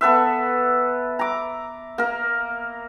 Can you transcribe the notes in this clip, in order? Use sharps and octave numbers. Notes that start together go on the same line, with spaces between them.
B3 A4 B4 E5
A#5 D6
A#3 A#4